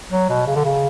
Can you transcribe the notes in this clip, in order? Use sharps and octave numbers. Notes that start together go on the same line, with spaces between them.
F#3
B2
C#3
D3
C#3